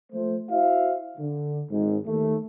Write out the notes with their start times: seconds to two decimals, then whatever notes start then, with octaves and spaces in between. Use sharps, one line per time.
0.13 F3 A3 C5
0.50 E4 F#4 C5 E5 F5
1.18 D3
1.71 G#1 G#2
2.06 D#2 A3